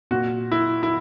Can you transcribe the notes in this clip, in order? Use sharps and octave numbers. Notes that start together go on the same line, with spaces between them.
A#2 F#4
E4
E4